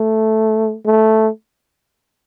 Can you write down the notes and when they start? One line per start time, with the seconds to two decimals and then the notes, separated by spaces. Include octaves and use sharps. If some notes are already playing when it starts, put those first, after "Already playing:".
Already playing: A3
0.86 A3